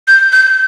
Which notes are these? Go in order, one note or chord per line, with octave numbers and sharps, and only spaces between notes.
G6
G6